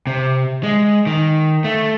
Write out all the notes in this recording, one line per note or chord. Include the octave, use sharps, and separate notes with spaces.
C3
G#3
D#3
A3